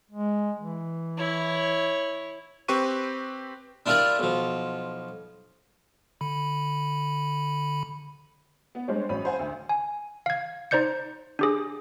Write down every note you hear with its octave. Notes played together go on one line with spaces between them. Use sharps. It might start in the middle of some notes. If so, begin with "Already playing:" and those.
G#3
E3
E4 C#5
C4 G4 B4 C#6 D#7
D4 E4 F4 G4 A#4 D5
B1 F3
D3 B5
B3
G3 G#3 D4 C5 C#5
A1 F#3 C#4 B5 D#7
C5 F5 F#5 G#5
D2
G#5
F5 G#6
D#4 C5 D5 G6 C#7
D4 G4 G#4